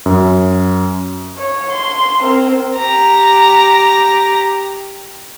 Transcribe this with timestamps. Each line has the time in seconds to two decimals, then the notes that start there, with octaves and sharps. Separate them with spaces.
0.06 F#2
1.38 C#5
1.71 C6
2.22 C4 A#4
2.77 G4 A#5